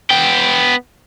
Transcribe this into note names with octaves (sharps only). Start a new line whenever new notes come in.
B3 G5